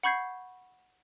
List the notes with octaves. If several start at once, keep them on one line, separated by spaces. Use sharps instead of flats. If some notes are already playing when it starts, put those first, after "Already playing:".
F#5 B5 C#6 G6 G#6 C7